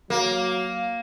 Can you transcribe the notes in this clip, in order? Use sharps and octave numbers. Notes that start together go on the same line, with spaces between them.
F#3 A#3